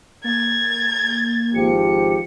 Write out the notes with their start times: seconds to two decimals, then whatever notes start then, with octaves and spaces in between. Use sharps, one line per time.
0.24 A#3 G#6 A6
1.55 G#1 F3 G4 C#7